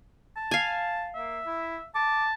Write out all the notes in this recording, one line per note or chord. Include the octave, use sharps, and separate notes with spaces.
A5
F5 G#5
A#3 E5
E4
A5 D6